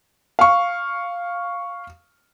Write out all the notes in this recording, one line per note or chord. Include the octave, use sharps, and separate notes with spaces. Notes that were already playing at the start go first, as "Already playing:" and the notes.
F5 C#6